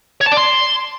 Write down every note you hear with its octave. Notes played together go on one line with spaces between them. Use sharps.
C#5
A5
D5
C6